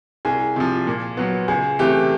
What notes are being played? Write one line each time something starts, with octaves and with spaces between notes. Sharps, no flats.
C2 G#4
C3 F3
A#2
F#3 B3
C#2 G#4
C3 E3 A3 G4